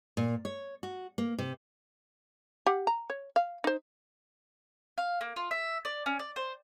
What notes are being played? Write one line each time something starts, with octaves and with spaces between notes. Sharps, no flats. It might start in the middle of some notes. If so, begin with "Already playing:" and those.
A#2
C#5
F#4
A#3
C3
G4 F#5
A#5
C#5
F5
D#4 C5
F5
A#3
F4
E5
D5
C#4
D5
C5